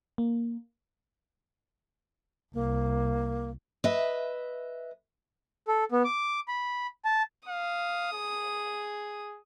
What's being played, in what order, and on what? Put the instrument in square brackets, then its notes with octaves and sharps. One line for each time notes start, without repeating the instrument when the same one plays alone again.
[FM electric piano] A#3
[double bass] C2 [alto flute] A#3
[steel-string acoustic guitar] B4 D#5 E5
[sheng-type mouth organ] A4
B3
D6
B5
A5
[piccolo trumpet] F5 [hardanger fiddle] D#6
[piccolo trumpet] G#4